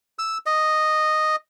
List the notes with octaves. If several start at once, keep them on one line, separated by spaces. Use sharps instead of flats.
E6
D#5